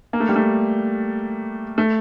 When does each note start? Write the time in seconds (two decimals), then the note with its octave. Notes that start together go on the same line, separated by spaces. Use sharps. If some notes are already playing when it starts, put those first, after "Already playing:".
0.13 A#3
0.20 A3
0.29 G3
0.36 A3
1.78 A3